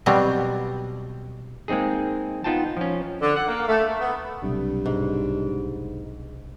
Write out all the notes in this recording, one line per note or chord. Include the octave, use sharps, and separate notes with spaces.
B2 F#3 G3 C4
G#3 A#3 C4 D#4 G#4
B3 D#4 F4 G5 A5
F3 C#4
D3
F#5
A#3
A3
A3
B3
B1 G2 C3
G#2